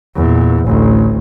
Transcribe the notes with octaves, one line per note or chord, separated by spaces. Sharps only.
E2 A#2
A1 D2